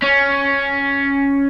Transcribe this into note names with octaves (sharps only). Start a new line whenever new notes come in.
C#4